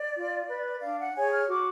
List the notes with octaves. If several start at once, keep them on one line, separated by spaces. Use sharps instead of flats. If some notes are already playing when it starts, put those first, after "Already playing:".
Already playing: D5
F4
B4
D4 F5
F#5
G#4 C#5 G#5
F6
F#4 D6